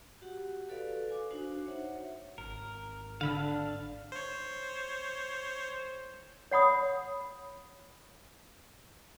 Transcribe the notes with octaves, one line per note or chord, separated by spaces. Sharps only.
F#4 G4 F#5
F#4 A4 B4 D5 F5
G#5 D6
D4 D#4 F#4 C5
C#5 E5 F#5
G#1 A#4
D3 D4 F5 B5 E6
C5 C#5
C#5 F#5 B5 D#6